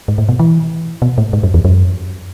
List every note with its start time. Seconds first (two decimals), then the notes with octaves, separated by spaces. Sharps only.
0.08 G#2
0.18 A2
0.29 B2
0.39 E3
1.02 B2
1.18 A2
1.33 G#2
1.43 F#2
1.54 E2
1.65 F#2